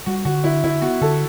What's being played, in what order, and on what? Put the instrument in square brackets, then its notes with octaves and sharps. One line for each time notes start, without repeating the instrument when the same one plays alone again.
[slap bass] G3 [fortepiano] F#4
[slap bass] D3 [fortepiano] F#4
[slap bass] D3 [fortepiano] E4
[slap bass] D3 [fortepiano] E4
[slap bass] B3 [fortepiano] F#4
[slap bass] D3 [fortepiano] A4